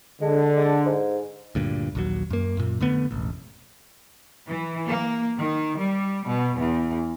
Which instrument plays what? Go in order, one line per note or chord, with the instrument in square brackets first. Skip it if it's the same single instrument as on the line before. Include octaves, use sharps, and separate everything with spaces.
[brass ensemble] D3 [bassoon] G#3
[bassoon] G#3
G#2
[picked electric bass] D2 G2 A#2
A#1 D#2 F#3
F#2 A#3
F#2 A#2
F2 D3 A3 B3
E1 A1
[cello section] E3
A#3
D#3
G3
B2
E2